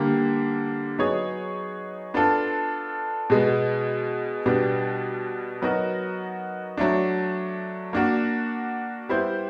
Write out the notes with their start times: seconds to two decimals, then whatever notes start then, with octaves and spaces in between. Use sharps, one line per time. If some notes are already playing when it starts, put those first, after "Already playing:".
Already playing: D3 G3 A#3
0.98 F#3 B3 D#4 G#4 C#5
2.14 B3 D4 F4 A4
3.30 B2 G#3 B3
4.46 B2 G3 B3 D4
5.62 F#3 B3 D#4 F#4 A#4
6.77 F#3 A3 D4
7.93 A#3 D4 F#4
9.09 G3 B3 E4 G4 C5